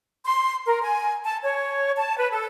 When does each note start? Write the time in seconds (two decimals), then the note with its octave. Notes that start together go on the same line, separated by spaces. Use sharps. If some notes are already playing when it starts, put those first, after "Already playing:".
0.25 C6
0.65 A#4
0.82 G#5
1.24 A5
1.43 C#5
1.98 A5
2.17 B4
2.31 A4